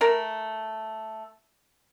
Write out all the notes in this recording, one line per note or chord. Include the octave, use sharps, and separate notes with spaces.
A3 A#4